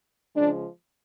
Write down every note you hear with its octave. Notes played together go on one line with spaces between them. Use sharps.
C#3 F3 G#3 D4